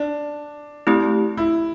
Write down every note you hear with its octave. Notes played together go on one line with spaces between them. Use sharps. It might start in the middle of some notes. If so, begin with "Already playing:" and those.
Already playing: D4
A3 C4 E4 G4
E4